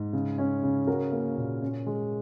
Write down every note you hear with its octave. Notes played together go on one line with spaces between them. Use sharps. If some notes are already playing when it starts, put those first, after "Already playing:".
Already playing: G#2
C#3
C#4
C#3
C#4 F#4 A#4
A#3
A#2
C#4
G#3